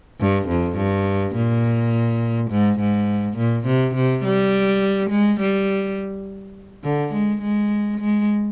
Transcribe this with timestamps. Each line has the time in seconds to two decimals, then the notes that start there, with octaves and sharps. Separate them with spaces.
0.20 G2
0.48 F2
0.77 G2
1.35 A#2
2.51 G#2
2.80 G#2
3.37 A#2
3.66 C3
3.95 C3
4.24 G3
5.10 G#3
5.40 G3
6.84 D3
7.13 G#3
7.41 G#3
8.00 G#3